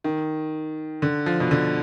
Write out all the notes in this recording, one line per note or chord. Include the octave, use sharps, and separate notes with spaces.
D#3
D3
F3
B2
D3